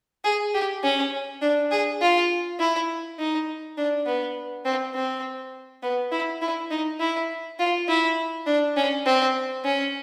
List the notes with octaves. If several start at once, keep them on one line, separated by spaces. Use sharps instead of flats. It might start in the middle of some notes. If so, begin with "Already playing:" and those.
G#4
G4
C#4
D4
G#4
F4
E4
D#4
D4
B3
C4
C4
B3
E4
E4
D#4
E4
F4
E4
D4
C#4
C4
C#4